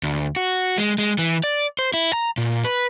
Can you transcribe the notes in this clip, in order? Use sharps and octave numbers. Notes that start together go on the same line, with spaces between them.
D2
F#4
G#3
G#3
E3
D5
C5
E4
A#5
A#2
B4